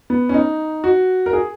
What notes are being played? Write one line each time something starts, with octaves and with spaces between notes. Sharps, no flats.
B3
C#4
D#4
F#4
A#4
G#4